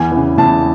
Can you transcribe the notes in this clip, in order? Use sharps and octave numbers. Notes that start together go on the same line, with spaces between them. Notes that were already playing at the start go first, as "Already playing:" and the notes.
Already playing: E2 G#5
C#3 E3
E2 A5